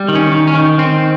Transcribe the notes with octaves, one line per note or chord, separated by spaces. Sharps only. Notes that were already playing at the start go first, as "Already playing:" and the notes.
Already playing: G3
D#3
C#4
D#3
C#4
D#3
D#3 C4